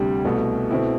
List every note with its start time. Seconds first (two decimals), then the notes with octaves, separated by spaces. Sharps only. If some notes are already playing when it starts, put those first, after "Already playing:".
Already playing: D2 C3 G3 D4 G4
0.25 C2 B2 A3
0.71 B2 A3 C4 E4